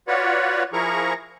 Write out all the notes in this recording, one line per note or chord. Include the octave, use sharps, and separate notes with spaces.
F4 F#4 B4 C#5 D5 F#5
F3 E4 G#4 A#4 A#5 C#6